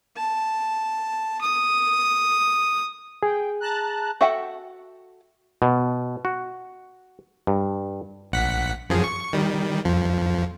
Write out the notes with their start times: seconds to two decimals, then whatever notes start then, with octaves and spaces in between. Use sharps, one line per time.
0.17 A5
1.41 D#6
3.23 G#4 G5
3.60 A5 A#5 F#6
4.21 F#4 A4 E5 F#5 G5
5.62 B2
6.25 F#4
7.47 G2
8.32 A#1 F#5 B6
8.90 F#2 F3 G#4
9.04 C#6
9.33 D#3 G3
9.85 F2 F3